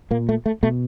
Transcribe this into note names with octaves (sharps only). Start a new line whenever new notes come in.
A#2 A#3
A3
A3
B2 A3